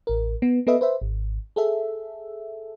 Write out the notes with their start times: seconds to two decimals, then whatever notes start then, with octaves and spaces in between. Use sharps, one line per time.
0.07 A1 A#4
0.42 B3
0.67 B3 A4 B4 D#5 E5
0.81 B4 C5 E5
1.02 G#1
1.56 G#4 A4 E5